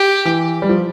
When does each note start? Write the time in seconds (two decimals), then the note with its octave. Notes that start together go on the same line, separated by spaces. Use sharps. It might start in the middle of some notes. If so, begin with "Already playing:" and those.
Already playing: G4
0.25 E3
0.62 G3
0.69 F3